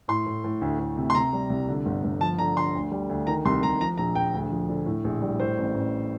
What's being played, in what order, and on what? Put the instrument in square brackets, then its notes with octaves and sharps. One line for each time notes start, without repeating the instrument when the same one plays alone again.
[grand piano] A2 C6
A2
A2
D2
D2
C3
C6
C3 A#5
G3
C2
D3
G1
G1
F3 A5
D3 A#5
D3 C6
D2
G3
D2
D#3 A#5
C2 C6
C2 A#5
F3 A#5
A#1 A#5
A#1 G5
D2
F3
D3
A2
A#1
G3
A2 C5
A1
A1